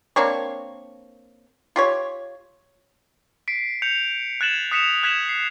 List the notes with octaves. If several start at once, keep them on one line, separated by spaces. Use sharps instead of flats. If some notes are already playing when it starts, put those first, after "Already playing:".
A#3 C4 D4 C#5
F4 G4 C#5
B6 C7 D7
G6 C#7 F7
F#6 G#6 A6 E7 F#7
D#6 F#6 B6 C#7 E7 F7
F#6 G#6 B6 E7 F#7
C7